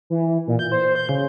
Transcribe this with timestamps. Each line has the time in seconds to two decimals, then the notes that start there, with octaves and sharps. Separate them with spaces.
0.10 E3
0.47 A#2
0.59 G6
0.72 C5
0.95 G6
1.09 C#3